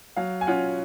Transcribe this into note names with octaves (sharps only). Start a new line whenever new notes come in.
F#3 F5
G#5
C#4 F4 F#5